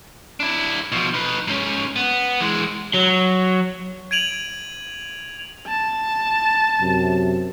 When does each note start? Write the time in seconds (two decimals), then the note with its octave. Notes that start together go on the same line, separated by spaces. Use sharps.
0.40 D4 E4
0.92 B2 F3
1.14 D#4 B4
1.47 G#2 C#4
1.96 B3
2.40 E3 G#3
2.94 F#3
4.11 G#6 D7 D#7 F7 F#7
5.67 A5
6.79 F#2 C3